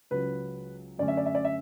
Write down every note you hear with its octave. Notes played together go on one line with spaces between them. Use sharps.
C#2 C#3 F#3 B4
F#2 D3 A3 C#4 D5
E5
D5
E5
D5
E5